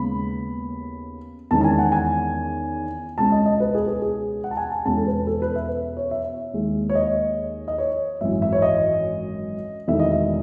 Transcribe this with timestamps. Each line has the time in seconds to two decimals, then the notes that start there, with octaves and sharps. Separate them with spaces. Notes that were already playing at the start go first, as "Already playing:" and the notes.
Already playing: D#2 C#3 G#3 B3 B5
1.51 E2 D#3 G#3 C#4 A5
1.61 A5
1.64 G#5
1.78 F#5
1.92 G#5
3.18 C#2 B2 G#3 C#4 A5
3.32 D#5
3.46 D#5
3.60 B4
3.75 G#4
3.88 G#4
4.02 G#4
4.44 F#5
4.51 A5
4.57 G#5
4.72 A5
4.85 E2 B2 G#3 C#4 A5
4.97 A4
5.07 B4
5.27 A4
5.42 B4
5.55 E5
5.97 C#5
6.11 E5
6.53 D#2 D#3 G#3
6.90 C#5
6.95 D#5
7.68 D#5
7.78 C#5
8.21 G#1 F#2 E3 E5
8.42 E5
8.53 C#5
8.62 D#5
9.87 E1 E2 D#3 A3 E5
9.99 D#5
10.12 E5